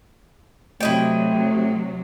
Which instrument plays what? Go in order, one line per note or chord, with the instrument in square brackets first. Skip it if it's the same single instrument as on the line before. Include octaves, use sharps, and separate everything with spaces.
[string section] C3 F#3 [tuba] A3 [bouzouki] E4 D#5 G5